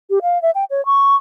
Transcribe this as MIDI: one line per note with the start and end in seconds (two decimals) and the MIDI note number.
0.10 0.19 67
0.22 0.41 77
0.42 0.51 76
0.55 0.65 79
0.71 0.84 73
0.86 1.16 85